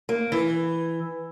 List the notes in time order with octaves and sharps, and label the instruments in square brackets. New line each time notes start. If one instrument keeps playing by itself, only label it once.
[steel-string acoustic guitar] A#3
E3